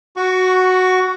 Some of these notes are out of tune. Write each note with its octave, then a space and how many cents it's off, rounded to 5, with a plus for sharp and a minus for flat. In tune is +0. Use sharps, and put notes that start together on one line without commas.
F#4 +0 F#5 +0 C#6 +20